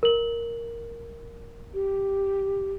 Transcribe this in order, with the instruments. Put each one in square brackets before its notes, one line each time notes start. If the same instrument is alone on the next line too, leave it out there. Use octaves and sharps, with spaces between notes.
[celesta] A#4 F#7
[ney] G4